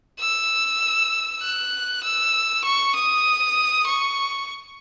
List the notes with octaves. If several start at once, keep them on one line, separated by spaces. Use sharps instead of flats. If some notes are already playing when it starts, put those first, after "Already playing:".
E6
F#6
E6
C#6
D#6
C#6